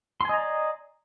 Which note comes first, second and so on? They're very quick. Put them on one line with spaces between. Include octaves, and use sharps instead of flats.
C6 G#5 D#5 A#5 D5